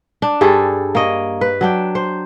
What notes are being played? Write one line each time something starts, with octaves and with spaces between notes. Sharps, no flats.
D4
G2 G3 G#4 A4
A#3 C#5 D#5
B4
F#3 D4 G5
C5